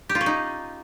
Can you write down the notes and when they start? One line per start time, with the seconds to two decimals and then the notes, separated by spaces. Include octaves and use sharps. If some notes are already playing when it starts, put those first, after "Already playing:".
0.09 G4
0.15 F4
0.21 C#4
0.26 D#4